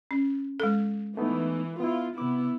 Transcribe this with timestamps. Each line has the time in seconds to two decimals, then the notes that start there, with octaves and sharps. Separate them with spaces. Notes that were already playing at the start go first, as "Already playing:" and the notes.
0.11 C#4
0.60 G#3 A4
1.17 E3 A3 B3 D#4
1.80 B3 E4 F4
2.18 C3 B3 E4 D6